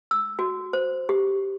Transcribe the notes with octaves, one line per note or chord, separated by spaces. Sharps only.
E6
F#4
C5
G4